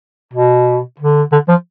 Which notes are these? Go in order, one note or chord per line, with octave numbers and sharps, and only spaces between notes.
B2
D3
D3
F3